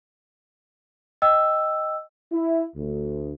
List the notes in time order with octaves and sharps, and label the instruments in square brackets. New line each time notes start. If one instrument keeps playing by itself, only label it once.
[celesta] D#5 G5 E6
[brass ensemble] E4
D2